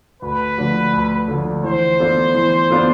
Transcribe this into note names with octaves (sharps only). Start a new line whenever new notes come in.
D2 B4
D3 F3 A3 D4
D2
D3 F3 A3 D4
E3 C5
B3 D4 F4 A4
E3
B3 D4 F4 A4